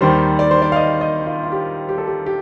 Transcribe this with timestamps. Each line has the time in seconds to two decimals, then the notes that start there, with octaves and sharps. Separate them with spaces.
0.01 D#2 D#3 G3 C5
0.39 D5
0.51 C5
0.62 D5
0.72 F5
0.76 D#5
1.01 D#5
1.26 F4
1.43 F4
1.52 G4
1.89 G4
1.98 A4
2.08 G4
2.26 G4